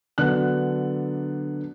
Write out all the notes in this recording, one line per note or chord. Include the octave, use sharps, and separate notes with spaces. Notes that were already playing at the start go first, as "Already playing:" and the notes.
D3 F#3 B3 D4 F#6